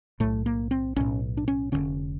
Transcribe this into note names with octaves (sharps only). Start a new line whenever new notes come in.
B1 A2 A3
A#3
C4
B1 A2 C#4
D4
C#4
F1 D#2 D3 C#4